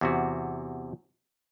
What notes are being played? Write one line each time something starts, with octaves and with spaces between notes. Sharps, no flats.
E2 C3 F#4